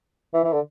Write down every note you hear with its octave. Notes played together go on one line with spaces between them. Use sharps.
E3
E3
D3